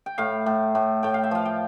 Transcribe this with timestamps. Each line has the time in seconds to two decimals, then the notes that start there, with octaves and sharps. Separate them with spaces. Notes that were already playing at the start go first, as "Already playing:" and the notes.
0.06 G5
0.18 A2 F5
0.46 A2
0.75 A2
1.03 A2 G5
1.14 F5
1.24 E5
1.31 F3 F5
1.45 G5